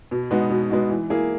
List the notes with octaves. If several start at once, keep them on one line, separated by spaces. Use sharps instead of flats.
B2
G#3 B3 D#4 F#4
B2
G#3 B3 D#4 F#4
E3
A#3 E4 G#4